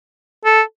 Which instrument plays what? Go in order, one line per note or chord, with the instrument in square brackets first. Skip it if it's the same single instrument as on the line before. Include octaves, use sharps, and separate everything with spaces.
[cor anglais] A4